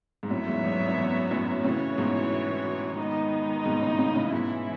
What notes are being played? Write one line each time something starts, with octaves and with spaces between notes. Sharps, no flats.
G#2
F#2 A2 F#3 B3 F#4 C#5 E5
E2 G#2
E2 G#2
G#2
F#2
E2
F#2 A2
A2 C#3 E3 B3 F#4 C#5
G#2 B2
D#3 G#3 B3 D#4
G#2 B2
A2 C#3
A2 C#3
A2 C#3
G#2 B2 E3 G#3 C#4 E4